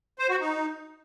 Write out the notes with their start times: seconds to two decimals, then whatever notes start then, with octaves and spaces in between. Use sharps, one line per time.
0.19 C5
0.30 F#4
0.40 D#4